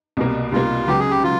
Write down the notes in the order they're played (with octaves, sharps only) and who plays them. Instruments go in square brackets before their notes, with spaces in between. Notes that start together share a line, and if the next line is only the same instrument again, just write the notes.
[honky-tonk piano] C2 B2 G3 A#3
[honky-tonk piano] C2 B2 G3 A#3 [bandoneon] F4
[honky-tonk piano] C#2 C#3 F#3 B3 [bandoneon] G4
[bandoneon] G#4
G4
[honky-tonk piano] C#3 F#3 [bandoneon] F4